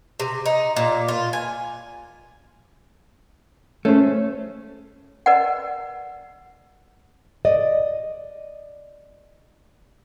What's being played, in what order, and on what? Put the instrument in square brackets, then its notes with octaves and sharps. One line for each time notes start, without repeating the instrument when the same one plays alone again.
[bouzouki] C3
D#4
A#2
F4
G#5
[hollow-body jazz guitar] A3 [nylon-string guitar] C#4 C5
[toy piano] A#4 B4 D5 D#5 F#5
[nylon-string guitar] D5 D#5